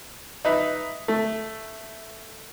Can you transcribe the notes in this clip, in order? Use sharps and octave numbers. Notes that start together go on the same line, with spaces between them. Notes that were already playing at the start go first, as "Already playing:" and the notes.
D#4 B4 E5
A3